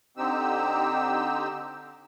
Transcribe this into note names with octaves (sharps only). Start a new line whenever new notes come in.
D3 C4 D#4 G4 E6